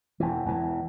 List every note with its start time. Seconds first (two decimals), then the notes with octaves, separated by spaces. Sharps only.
0.20 E1 E3
0.46 E1 E3